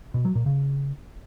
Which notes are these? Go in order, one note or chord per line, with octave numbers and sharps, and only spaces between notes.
B2
F#3
A#2
C#3